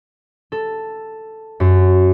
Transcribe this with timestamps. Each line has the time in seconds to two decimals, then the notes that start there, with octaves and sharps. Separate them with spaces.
0.52 A4
1.60 F#2